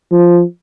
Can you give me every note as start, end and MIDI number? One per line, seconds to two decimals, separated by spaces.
0.11 0.42 53